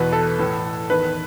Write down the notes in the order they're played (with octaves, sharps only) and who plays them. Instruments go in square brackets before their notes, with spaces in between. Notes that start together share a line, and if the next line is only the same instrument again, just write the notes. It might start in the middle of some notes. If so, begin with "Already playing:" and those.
Already playing: [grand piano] E2 B2 B4
A4
A2 E3
E2 D#3 B4